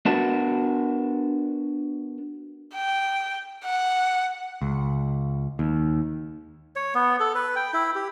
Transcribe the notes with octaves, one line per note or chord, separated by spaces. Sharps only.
B3 D4 F#4 A#4 F#5 A5
G5
F#5
C#2
D#2
C#5
B3
A4
B4
G5
E4
G4